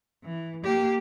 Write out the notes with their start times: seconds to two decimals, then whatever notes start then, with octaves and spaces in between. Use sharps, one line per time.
0.24 E3
0.64 A#3 G4